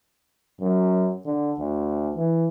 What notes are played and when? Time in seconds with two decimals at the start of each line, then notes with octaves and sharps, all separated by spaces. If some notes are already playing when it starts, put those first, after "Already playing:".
0.61 F#2
1.26 D3
1.59 D2
2.16 E3